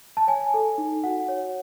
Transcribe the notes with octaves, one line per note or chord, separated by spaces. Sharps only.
A5
C#5 G#5
A4
D#4
F#4 F#5
C#5